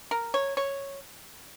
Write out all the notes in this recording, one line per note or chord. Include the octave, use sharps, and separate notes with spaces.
A#4
C#5
C#5